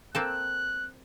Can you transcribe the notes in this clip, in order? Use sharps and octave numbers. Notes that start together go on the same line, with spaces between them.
A#3 C4 A4 F#6